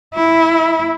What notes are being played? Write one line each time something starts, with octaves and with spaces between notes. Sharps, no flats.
E4